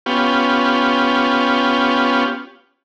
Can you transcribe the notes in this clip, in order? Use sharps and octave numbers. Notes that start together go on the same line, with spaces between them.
B3 C#4 F4 G4